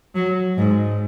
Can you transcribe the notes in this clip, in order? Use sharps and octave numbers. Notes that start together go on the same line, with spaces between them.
F#3
G#2